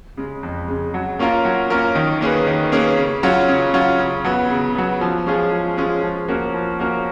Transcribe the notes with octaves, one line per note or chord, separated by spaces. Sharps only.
C#3 G#3
F2
C#3 G#3
F#3
A#3 C#4 F4 A#4
F#3
A#3 C#4 F4 A#4
D#3
A#3 C#4 G#4 B4
D#3
A#3 C#4 G#4 B4
C#3
F#3 C#4 F4
C#3
F#3 C#4 F4
C#3
F#3 B3
C#3
F#3 B3
F3
G#3 C#4 F4 G#4
F3
G#3 C#4 F4 G#4
F3
A#3 C#4 F#4 A#4
F3
A#3 C#4 F#4 A#4